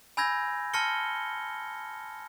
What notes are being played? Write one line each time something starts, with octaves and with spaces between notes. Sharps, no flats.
G#5 B5 E6 G6 G#6 A#6
A5 C6 F6 A#6 C#7 G7